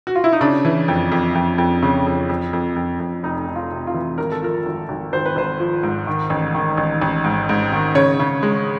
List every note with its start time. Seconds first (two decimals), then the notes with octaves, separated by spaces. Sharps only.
0.07 F#4
0.15 F4
0.24 E4
0.33 D#4
0.41 C#3 D4
0.65 E3
0.88 F2
1.12 F2
1.35 F2
1.58 F2
1.83 C#3
2.07 F2
2.29 F2
2.53 F2
2.76 F2
3.00 F2
3.23 F1 D#4
3.48 F1
3.55 F4
3.72 C3
3.87 F4
3.94 E3
4.18 G#1 A#4
4.32 A4
4.42 F3 A#4
4.66 G#1
4.89 G#1
5.13 G#1 C5
5.26 B4
5.36 G#1 C5
5.60 F3
5.83 G#2
6.07 D#3
6.30 A1
6.55 D#3
6.77 A1
7.02 A1
7.24 G#2
7.49 G#2
7.73 D#3
7.95 C#3 C#5
8.20 C#3
8.43 G#3